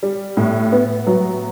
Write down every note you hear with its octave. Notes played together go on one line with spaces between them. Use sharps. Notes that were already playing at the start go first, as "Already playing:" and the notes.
G3
A2
B3
F#3